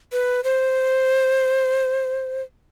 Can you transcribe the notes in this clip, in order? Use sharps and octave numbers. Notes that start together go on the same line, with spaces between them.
B4
C5